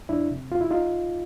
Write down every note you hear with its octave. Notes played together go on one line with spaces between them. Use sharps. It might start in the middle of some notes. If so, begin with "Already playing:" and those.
F2 D4 E4
C3
F2 F4
E4
D#4 F4